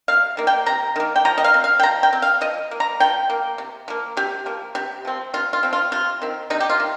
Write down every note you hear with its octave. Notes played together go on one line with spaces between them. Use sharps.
C3 F5
D#3 A#3
G5
C3 A#5
D#3 A#3
G5
F3 A#5
D#5
F5
C4
F5
G5
F3 A#5
G5
C4
F5
F3 D#5
A#3
A#5
F3 G5
A#3
C3
F3 A#3
C3 G4
F3 A#3
C3 G4
F3 C4
C3 F4
F4
F3 C4
F4
C3 F4
D#3 C4
C3 D#4
G4
F4
D#3